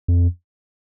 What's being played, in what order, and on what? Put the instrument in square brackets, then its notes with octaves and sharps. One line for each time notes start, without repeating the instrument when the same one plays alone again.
[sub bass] F2